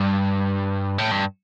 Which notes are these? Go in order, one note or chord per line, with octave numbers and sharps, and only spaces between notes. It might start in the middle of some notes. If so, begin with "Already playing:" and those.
Already playing: G2
A2
G2